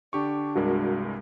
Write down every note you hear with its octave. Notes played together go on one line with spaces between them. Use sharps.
D3 D4 G4 C#6
C2 G2 G#3 F#4 A#4